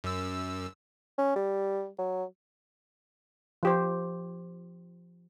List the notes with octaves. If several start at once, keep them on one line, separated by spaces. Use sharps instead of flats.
F#2 E6
C#4
G3
F#3
F3 G4 C5